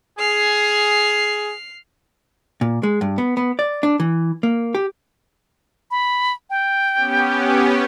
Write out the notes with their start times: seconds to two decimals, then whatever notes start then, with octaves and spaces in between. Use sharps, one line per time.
0.19 G#4 F6 C7
2.61 A#2
2.83 G#3
3.01 G2
3.18 B3
3.37 B3
3.59 D5
3.83 D4
4.00 E3
4.43 A#3
4.75 G4
5.91 B5
6.50 G5
6.93 B3 C#4 G4